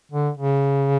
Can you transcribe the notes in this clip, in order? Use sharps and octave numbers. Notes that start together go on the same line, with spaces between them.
D3
C#3